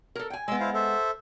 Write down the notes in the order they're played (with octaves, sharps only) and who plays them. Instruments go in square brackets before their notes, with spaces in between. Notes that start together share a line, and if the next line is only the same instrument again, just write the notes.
[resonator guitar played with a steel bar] A4 A#4
G5 G#5
[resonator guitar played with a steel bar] G#3 B3 [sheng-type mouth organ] C6 E6
[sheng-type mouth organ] E4 C5 F5
A4 C5 E5